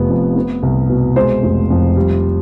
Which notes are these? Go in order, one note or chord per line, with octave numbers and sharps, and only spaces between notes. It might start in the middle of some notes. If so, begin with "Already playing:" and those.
Already playing: F1 C3 B3
F2
B3
C2
B2
G#3 C5
F1
F2
G3